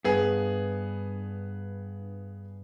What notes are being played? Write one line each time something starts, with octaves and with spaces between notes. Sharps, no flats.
G2 B3 G#4